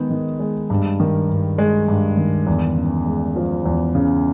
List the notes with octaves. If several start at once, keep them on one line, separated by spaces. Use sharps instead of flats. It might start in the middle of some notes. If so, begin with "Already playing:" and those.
Already playing: D#3 G#3 B3 D#4
D#3
G#3
G2
D#3
G2
G#3
G2
D#3
E2
C#3
G#3
F3
E2
C#3